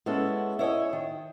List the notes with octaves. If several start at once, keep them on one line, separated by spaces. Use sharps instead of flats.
G#3 B3 C#4 E4 A4
E4 C#5 D#5 G#5
D#3